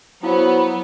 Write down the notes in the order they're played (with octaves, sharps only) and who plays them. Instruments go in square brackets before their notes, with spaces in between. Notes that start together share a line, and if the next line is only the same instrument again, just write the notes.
[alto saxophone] F#3 [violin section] B3 [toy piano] E4 F5 [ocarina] C5